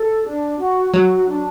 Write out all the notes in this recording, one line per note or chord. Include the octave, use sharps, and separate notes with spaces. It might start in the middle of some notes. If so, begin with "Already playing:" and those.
Already playing: A4
D4
F#4
F#3 F#4
D4